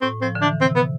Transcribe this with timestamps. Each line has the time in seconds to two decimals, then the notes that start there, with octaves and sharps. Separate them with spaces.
0.02 A2 C4
0.22 F3 C4
0.35 D3
0.42 E3 D4
0.61 C3 C4
0.76 B3